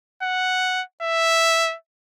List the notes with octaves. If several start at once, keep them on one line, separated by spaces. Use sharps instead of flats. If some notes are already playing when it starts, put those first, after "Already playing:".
F#5
E5